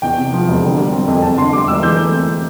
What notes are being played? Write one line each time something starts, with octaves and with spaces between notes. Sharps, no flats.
E2 G5
C3
F3
E1
D3
G3
C4
F2
E2 A5
D3 C6
G3 D6
E1 E6
E3 G6
A3
C4